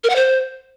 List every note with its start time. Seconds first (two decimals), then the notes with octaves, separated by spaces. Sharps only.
0.04 A#4
0.10 F#5
0.16 C5